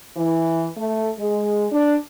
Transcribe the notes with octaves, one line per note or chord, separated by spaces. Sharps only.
E3
A3
G#3
D4